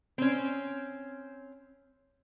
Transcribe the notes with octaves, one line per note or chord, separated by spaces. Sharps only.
C4 C#4